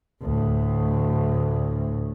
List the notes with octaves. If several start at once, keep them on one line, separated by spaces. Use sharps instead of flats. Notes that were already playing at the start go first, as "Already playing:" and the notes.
D2 A2